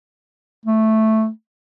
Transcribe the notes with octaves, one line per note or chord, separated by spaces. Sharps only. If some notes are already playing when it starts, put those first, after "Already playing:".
A3